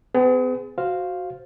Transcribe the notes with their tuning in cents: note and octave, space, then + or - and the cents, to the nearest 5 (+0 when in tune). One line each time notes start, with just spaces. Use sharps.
B3 +45 G#4 +0
F#4 +0 C5 +0 F5 +0